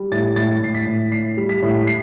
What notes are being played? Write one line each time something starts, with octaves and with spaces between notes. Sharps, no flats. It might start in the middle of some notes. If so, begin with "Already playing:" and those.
Already playing: G3
A2 A6
A2 A6
A2 C7
B6
A2
A2 C7
G3
B6
A2
C7